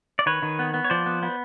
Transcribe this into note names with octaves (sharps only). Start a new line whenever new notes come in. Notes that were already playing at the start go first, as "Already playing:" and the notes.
D5
D#3 B4 C#5
D#3
B3
B3
C#5
F3 C5 D5
B3
B3